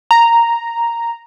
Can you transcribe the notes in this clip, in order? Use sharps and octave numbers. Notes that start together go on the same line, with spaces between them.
A#5